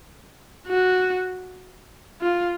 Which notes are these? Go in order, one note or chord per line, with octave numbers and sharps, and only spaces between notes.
F#4
F4